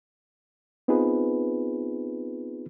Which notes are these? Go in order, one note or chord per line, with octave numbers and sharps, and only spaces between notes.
B3 C4 D#4 F4 G#4 B4